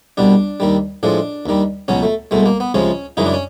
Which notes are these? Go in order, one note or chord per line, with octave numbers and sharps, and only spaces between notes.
C2 B2 G3 D4
D#2 D#3 G3
A2 F3 G#3 D4
D#2 D#3 G3
C#2 B2 F#3 C#4
A3
C2 B2 G#3 A3
A#3
B3
C#2 C3 F3 G#3 C#4
F#2 C#3 E3 G#3 D#4
D4
C#4